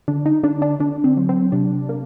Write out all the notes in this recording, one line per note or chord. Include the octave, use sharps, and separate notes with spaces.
D3 D4
D#4
D3 D4
D4
D3 D4
C4
F#3
C4
C3 D4
A#3